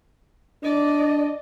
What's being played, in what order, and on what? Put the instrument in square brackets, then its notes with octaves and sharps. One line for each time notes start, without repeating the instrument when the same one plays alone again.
[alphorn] D4 [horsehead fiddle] D5 D#5